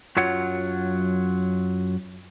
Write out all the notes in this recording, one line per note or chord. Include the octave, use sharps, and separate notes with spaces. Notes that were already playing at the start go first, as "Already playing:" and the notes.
F#2 F#3 F4 C#5 F#5